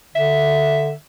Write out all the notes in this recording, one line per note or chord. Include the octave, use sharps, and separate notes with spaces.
D3 E5